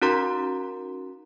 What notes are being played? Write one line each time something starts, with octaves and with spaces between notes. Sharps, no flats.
C#4 D#4 F#4 A#4 A#5 C6